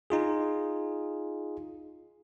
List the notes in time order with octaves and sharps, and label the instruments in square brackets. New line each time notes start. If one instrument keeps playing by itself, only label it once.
[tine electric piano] D#4 F4 G#4